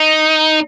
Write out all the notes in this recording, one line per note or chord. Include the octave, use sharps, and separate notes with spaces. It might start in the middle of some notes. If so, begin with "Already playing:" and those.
Already playing: D#4